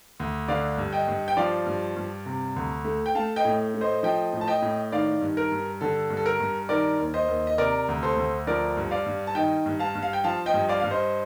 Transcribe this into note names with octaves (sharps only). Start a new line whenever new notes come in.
D2
D3 D5 F5
G2
D#5 G5
G2
G5
F3 D5 F5
G2
G2
C3
D2
A3
G5
A3 F5 A5
D#5 G5
A2
A3
C5 D#5
F3 D#5 G5
A2
A5
D#5 G5
A2
D#3 D5 F5
G2
A#4
G2
D3 A4
G2
A4
A#4
G2
D#3 A#4 D5
D#2
C5 D#5
D#2
D#5
C3 A#4 D5
D2
A4 C5
D2
F3 A#4 D5
G2
D5 F5
G2
A5
D#3 D#5 G5
G2
F5 A5
G2
F5
G5
F3 F5 A5
D#5 G5
G2
D5 F5
G2 F5
C5 D#5